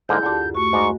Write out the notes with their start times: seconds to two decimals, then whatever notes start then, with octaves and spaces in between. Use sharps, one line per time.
0.09 G#2 D3 A#3 E4 G#4 G6
0.23 D2 D3 D4 F4 G4
0.41 F#2
0.55 A3 F#4 C#6
0.73 G#2 F#4 D5 A#5